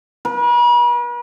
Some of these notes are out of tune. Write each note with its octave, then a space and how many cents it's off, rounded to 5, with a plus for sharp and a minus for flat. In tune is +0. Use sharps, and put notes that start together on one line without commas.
B4 -45